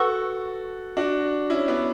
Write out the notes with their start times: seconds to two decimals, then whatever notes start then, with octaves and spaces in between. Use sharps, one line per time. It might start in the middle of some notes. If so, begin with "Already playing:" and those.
Already playing: F#4 A4 B4 F#5 C#6 E6
0.97 D4 F#4
1.50 C#4 E4
1.68 B3 D4